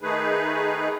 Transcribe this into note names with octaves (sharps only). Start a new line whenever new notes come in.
D#3 A3 D#4 G#4 B4